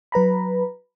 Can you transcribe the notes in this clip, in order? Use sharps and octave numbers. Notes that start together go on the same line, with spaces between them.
F#3 B4 A#5 B5